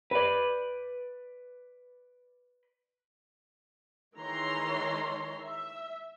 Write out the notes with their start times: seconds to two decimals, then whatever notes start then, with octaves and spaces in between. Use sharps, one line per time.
0.11 B4 D5
4.17 D#3 E3 G#3 C#5 A#5 C6
5.44 E5